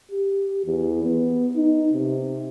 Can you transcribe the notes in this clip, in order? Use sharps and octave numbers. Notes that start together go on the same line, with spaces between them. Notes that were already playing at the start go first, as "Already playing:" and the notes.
G4
E2
B3
D#4
C3